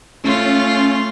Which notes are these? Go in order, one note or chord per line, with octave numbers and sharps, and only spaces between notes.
A3 C#4 F4